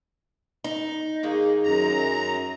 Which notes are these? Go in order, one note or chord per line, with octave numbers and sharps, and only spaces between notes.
D#4
D#3 G#3 A#3 G#4
F#2 A#5